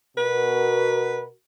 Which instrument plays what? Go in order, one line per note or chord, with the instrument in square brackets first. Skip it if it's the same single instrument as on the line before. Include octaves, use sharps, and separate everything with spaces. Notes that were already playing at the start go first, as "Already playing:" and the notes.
[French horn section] B2 F#4 A#4 [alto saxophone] B4